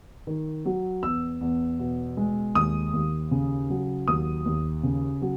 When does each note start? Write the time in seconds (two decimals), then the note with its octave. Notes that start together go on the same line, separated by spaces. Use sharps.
0.27 D#3
0.65 F#3
1.03 E2 E6
1.41 E2
1.79 B2
2.17 G#3
2.55 D#2 D#6
2.93 D#2
3.31 C#3
3.70 F#3
4.08 D#2 D#6
4.45 D#2
4.83 C#3
5.22 F#3